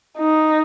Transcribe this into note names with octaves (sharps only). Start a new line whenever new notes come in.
D#4